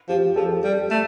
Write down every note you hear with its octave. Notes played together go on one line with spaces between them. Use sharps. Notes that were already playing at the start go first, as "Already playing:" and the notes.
F3 G4
F3 A4
G3
A3